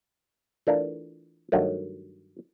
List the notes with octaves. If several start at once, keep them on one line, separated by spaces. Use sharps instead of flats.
E3 A3 D4 F4 A#4
G2 D#3 F#3 A3